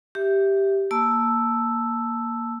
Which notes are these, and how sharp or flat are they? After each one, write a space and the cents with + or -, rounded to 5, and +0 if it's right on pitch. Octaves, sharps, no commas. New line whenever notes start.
G4 +0 E5 +0
A#3 +0 A5 +0 E6 +0